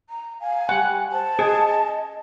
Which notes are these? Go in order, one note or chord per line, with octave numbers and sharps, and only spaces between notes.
A#5
F5 G#5
G3 F#5
C5 A5
G#4 D#5